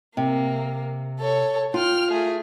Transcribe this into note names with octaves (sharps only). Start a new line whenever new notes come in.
C3 A#3
A4 C#5
F4 G5 F6
A3 G#4